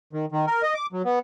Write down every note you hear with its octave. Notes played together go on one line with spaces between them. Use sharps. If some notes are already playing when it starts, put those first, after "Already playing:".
D#3
D#3
A#4
D#5
D6
F#3
B3